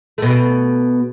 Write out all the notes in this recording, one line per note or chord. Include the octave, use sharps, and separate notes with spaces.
B2 A3